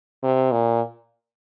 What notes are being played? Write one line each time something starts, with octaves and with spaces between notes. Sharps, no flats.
C3
A#2